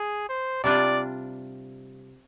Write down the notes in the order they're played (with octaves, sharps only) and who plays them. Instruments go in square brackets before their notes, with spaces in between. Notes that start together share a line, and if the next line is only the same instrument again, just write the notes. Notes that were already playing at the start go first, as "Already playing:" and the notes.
Already playing: [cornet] G#4
C5
[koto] C3 G3 D4 F4 [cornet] D5